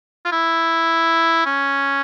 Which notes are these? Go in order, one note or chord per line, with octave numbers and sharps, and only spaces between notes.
F4
E4
C#4